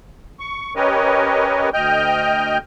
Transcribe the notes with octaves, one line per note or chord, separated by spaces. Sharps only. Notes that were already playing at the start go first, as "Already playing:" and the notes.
C#6
C#4 G4 A#4 B4 C#5 D#5
D2 D#5 G5 F6 G6